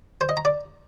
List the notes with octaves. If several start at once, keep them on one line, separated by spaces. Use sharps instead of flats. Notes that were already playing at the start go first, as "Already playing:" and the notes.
C5
D#5
A#5
D5